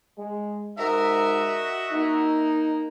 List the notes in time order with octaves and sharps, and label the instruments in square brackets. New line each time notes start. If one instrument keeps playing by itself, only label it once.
[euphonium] G#3
[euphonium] G#2 [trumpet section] F#4 D#5 E5 [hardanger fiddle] A#4
[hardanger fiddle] A#3 [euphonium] D#4